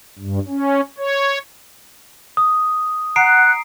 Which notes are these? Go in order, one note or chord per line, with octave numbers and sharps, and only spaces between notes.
G2
C#4
C#5
D#6
F#5 A#5 F#6 C7 D7